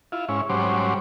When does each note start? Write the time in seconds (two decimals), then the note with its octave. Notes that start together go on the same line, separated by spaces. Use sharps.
0.12 E4 F4
0.29 G#2 C#4 E4
0.49 G#2 F#3 G3 C#4 C5 D6